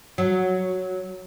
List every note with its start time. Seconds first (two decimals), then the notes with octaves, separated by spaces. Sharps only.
0.18 F#3